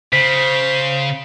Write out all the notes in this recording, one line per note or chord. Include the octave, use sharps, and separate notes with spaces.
C#3 C5 B6